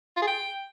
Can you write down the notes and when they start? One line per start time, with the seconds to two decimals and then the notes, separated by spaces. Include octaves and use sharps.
0.17 F4
0.22 G#4
0.27 G5